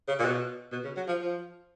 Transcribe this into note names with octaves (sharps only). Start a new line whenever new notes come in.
C#3
A#2
B2
B2
C#3
F#3
F3
F3